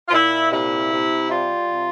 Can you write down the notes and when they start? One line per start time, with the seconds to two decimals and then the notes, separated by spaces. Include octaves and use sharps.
0.08 F4
0.12 A#2 E4
0.51 C3 E4
0.91 C3
1.30 G3 F4
1.68 C3